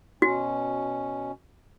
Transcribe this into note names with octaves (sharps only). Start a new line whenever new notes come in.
B2 C#4 F#4